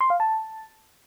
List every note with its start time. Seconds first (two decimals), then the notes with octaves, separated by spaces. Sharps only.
0.01 C6
0.10 F5
0.20 A5